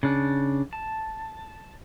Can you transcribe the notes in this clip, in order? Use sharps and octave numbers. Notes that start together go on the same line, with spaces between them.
C#3 D4
A5